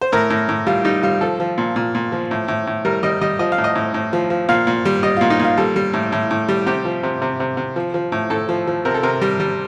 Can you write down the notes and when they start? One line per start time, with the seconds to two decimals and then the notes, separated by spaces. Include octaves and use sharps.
0.01 C5
0.12 A2 A#4
0.30 A2
0.49 A2
0.67 G3 F4
0.84 G3 D#4
1.03 G3 F4
1.21 F3 A4
1.40 F3
1.58 A#2
1.76 A#2
1.95 A#2
2.12 F3
2.31 A2
2.48 A2
2.67 A2
2.85 G3 A#4
3.03 G3 D#5
3.21 G3 D#5
3.39 F3 D#5
3.52 F5
3.58 A2
3.64 D#5
3.75 A2
3.94 A2
4.13 F3
4.30 F3
4.49 A#2 F5
4.67 A#2
4.85 G3
5.03 G3 D#5
5.17 A#2 F4
5.30 D#4
5.40 A#2 F4
5.57 G3 A4
5.76 G3
5.93 A2
6.12 A2
6.31 A2
6.48 G3
6.66 C3 G4
6.85 F3
7.03 C3
7.22 C3
7.40 C3
7.57 C3
7.76 F3
7.94 F3
8.12 A2
8.30 A2 A4
8.49 F3
8.67 F3
8.85 C3 A#4
8.94 A4
9.03 C3 A#4
9.21 G3
9.40 G3